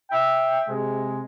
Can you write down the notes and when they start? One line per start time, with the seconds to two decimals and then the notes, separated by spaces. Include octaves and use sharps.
0.11 E5 G5
0.69 C3 G#3